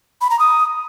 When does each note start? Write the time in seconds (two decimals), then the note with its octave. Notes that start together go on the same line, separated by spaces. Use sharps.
0.21 B5
0.30 A#5
0.39 D#6